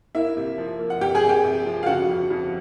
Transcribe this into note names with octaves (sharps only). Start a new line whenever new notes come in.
A#3 E4 E5
C3
F3
A#3
F#5
C3 G4 G5
G#4 G#5
C3
G4 G5
C3
F3
F5
C#3 F#4 F#5
F2
F2